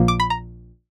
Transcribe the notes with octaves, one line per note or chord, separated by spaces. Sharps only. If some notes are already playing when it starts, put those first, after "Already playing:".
Already playing: A#1 A#2 F3 A#3
D6
B5
A#5